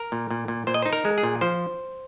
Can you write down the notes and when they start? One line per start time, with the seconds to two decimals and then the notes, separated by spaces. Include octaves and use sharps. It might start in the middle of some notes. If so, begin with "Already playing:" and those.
Already playing: A#4
0.12 A#2
0.31 A#2
0.48 A#2
0.67 A#2 C5
0.74 D#5
0.82 C5
0.86 D#4
0.93 A#4
1.05 G#3
1.18 G#4
1.23 A#2
1.41 F3 C5